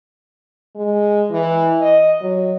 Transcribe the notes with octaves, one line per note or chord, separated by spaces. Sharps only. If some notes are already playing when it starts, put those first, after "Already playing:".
G#3
E3
D#5
F#3